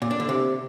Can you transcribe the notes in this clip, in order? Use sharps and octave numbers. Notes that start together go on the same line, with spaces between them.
A#2
D4
D3
C3